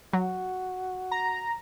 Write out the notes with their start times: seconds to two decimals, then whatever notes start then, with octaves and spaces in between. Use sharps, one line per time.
0.13 F#3 F#4
1.11 A#5